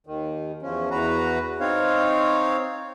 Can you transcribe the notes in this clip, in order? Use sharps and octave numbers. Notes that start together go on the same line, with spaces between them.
D#2 D#3
E2 F3 C#4
E2 F#4 B4 A#5
C4 D#4 C#5 F5